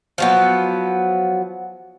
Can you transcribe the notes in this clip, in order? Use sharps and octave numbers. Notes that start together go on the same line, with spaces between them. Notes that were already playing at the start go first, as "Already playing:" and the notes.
F3 F#3 B3